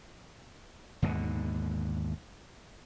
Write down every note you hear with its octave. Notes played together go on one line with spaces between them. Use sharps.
D#2 G#2 B2 D3